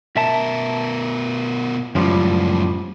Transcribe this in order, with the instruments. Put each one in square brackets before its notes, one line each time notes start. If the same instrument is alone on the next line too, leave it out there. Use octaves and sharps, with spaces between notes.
[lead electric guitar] B2 A#4 [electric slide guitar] E5 A5
[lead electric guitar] C#2 A2 [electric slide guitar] F#2 F3 G3